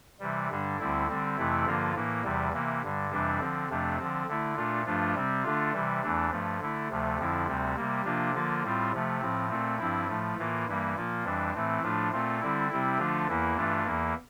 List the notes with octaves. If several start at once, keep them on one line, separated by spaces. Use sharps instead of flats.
C3 E3 G3
G2 D3 G3 D4
D2 D3 G3 C4 E4
D3 G3 C4
F2 C3 E3 A3 E4
G2 D3 F3 A#3 F4
A2 E3 A#3
E2 C3 E3 G3
C3 E3 A#3
G2 D3 G3
F2 C3 E3 G3 D4
D3 F3 C4
F2 C3 F3 A3 D4
D3 F3 C4
D3 A3 E4
A#2 A3 D4 F4
G2 F3 A3 D4 F4
C3 G3 C4
D3 A3 D4 F4
C3 E3 G3
E2 E3 A3 D4
G2 F3 A3
D3 A3 E4
D2 C3 F3 A3
F2 D3 F3 C4 E4
D2 C3 G3 C4
C3 G3 A#3
C3 F3 A#3 D4 F4
D3 F3 A#3 F4
A2 G3 C4 F4
C3 F3 A3
A2 F3 C4
A#2 A3 C4
G2 F3 C4 E4
A2 F3 A3
A2 E3 A#3 F4
G2 E3 G3 A#3
A#2 F3 A#3 F4
F2 E3 G3 D4
A2 E3 A3 C4
A2 F3 A3 D4 F4
A#2 A3 C4 F4
D3 G3 C4 E4
C3 G3 C4 E4
D3 F3 A3 D4 F4
E2 E3 A#3 E4
G2 E3 A3 D4 F4
E2 E3 A#3